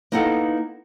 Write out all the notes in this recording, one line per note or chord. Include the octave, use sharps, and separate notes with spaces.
A#3 B3 D#4 E4 A4 F#5